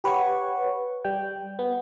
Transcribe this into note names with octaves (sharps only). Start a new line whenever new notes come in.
G4 B4 C#5 F#5 C#6
G3 G5
B3